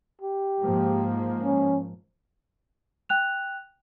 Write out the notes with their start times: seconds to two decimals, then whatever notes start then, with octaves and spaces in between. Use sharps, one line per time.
0.22 G4
0.61 G#2 F3 A#3
1.44 C#4
3.09 G5 F#6 F7